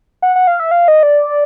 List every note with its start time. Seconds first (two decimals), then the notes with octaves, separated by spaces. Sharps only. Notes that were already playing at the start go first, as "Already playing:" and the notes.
0.22 F#5
0.36 F#5
0.47 F5
0.60 E5
0.71 F5
0.88 D#5
1.03 D5